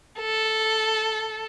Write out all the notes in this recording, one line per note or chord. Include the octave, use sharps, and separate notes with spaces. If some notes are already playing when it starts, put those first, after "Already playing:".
A4